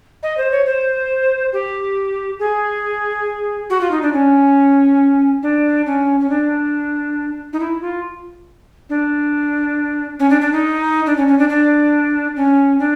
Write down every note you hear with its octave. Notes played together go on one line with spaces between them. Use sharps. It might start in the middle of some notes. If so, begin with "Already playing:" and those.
D#5
C5
C#5
C5
G4
G#4
F#4
F4
D#4
D4
C#4
D4
C#4
C#4
D4
D#4
E4
F4
D4
C#4
D4
D4
D#4
D4
C#4
C#4
D4
D4
C#4
D4